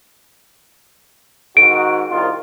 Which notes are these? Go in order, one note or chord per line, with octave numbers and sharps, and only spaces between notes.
G#2 D#3 F#4 D7
C2 D#3 F4